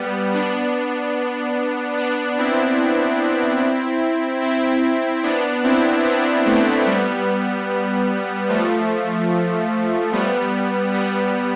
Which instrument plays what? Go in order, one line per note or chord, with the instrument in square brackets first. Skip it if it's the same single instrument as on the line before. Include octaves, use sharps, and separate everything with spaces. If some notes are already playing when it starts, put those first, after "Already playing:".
Already playing: [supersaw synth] G3 B3
B3 D4
B3 D4
C4 E4
C4 E4
B3 D4
C4 E4
B3 D4
A3 C4
G3 B3
F3 A3
G3 B3
G3 B3